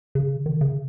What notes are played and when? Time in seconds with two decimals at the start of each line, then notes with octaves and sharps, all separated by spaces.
0.15 C#3
0.46 D#3
0.61 C#3